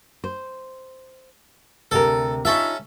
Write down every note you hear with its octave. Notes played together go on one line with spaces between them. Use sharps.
C5
D2 C3 A4 A#4
C#4 D#4 F4 A4 E5